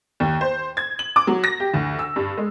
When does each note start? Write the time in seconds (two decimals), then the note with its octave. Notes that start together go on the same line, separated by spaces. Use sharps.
0.20 D#2
0.41 C5
0.77 G#6
0.99 F#7
1.16 D6
1.27 F#3
1.44 A#6
1.60 G4
1.74 D2
1.99 E6
2.16 G2
2.37 G#3